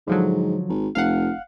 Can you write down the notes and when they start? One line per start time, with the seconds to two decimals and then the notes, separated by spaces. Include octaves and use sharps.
0.07 G#2 D3 F3 F#3
0.69 G#1
0.95 F1 F5 F#5